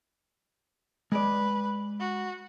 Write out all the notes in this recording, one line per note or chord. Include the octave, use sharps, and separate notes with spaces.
G#3 B4 D5
F#4